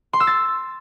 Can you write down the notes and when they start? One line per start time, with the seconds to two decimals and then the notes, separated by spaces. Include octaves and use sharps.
0.13 C6
0.20 E6
0.27 A6